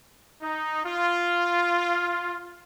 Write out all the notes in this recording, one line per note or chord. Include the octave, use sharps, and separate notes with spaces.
D#4
F4